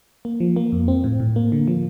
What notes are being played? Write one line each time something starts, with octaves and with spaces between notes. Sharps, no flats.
A#3
F3
A#3
F2
C4
A2
A2
A#3
D3
F3